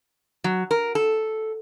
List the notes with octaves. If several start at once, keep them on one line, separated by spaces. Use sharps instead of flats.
F#3
A#4
A4